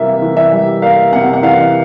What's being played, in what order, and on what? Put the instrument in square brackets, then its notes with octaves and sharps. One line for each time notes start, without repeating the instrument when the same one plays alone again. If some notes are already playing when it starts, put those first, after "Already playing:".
Already playing: [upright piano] C3 E3 G3 A#3 E5
E3
E5
G3
A#3 F5
C3 F#5
F#5
E3 F5